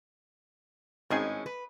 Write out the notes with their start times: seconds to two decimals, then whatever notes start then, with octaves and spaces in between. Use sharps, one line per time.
1.10 G#1 A2 D#3 G#3 C#4 G#4
1.46 B4